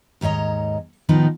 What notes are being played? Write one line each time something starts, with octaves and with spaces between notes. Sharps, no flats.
D#2 G#2 C#5 D#5 A#5
A2 D#3 F3 B3 D#4